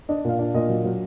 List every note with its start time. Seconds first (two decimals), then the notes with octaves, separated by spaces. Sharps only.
0.09 D4 D#5
0.24 A#2 F5
0.39 D4 F5
0.54 A#2 D#5
0.69 F#3
0.84 F#3